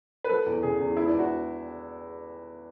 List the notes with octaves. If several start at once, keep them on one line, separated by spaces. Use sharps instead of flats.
B4
F#3 A4
E2
C#3 G#4
E2
G#3 E4
D4
E2
F#4